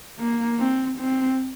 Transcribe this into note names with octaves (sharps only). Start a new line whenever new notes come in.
A#3
C4
C4